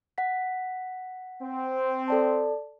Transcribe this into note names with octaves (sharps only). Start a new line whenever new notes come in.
F#5 B6
C4
A4 D5 A5